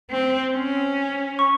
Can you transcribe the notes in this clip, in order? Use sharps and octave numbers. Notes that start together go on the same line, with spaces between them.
C4
C#4
C#6